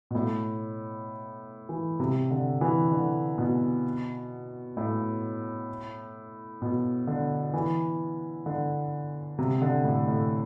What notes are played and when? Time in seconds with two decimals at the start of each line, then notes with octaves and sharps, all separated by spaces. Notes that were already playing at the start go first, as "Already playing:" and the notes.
0.11 B2
0.15 A2
1.69 E3
2.00 C3
2.31 D3
2.61 E3
2.92 D3
3.38 B2
4.77 A2
6.62 B2
7.07 D3
7.54 E3
8.46 D3
9.38 C3
9.61 D3
9.84 A2
10.08 A2